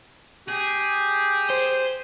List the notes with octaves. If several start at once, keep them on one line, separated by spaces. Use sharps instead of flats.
G4 G#4
C5